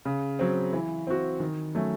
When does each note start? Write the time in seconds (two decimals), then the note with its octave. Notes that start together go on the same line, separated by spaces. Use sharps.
0.05 C#3
0.39 F#3 C4
0.73 E3
1.07 C4 F#4
1.40 D#3
1.75 F#3 A3 C#4